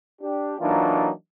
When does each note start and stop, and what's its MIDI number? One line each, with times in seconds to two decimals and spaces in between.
0.22 0.56 62
0.22 0.56 67
0.60 1.10 52
0.60 1.10 54
0.60 1.10 58
0.60 1.10 62
0.60 1.10 63
0.60 1.10 65